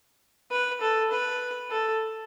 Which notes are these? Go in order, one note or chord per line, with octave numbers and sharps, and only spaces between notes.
B4
A4
B4
A4